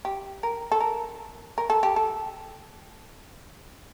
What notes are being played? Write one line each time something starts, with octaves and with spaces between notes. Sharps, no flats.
G4
A#4
A4
A#4
A#4
A4
G4
A4